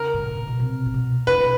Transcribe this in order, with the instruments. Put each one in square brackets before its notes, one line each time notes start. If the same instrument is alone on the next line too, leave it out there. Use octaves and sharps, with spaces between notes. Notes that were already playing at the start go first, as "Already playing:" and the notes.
Already playing: [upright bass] C#3 [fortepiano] A#4
[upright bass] G#2
A2
A#2
B2
C3
A#2
B2
[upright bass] C#3 [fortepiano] B4
[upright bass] D3